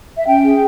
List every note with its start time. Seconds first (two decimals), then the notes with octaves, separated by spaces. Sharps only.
0.17 E5
0.26 C#4 G5
0.44 G#4